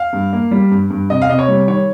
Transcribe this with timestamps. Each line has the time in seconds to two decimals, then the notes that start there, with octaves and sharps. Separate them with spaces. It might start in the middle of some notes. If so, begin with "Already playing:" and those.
Already playing: F5
0.13 G2
0.33 A#3
0.51 G3
0.71 G2
0.90 G2
1.10 C3 D#5
1.22 F5
1.29 C3 D#5
1.39 C#5
1.48 G3
1.67 D#3 C#5